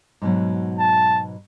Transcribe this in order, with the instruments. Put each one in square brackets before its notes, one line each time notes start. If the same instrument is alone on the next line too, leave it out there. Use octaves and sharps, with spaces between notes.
[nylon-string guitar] G#2 B2 F#3
[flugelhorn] A5